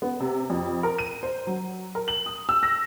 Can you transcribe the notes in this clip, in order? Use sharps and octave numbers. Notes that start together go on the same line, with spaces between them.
B3
C3
F2
A#4
D#7
C5
F#3
A#4
F#7
D#6
E6
A#6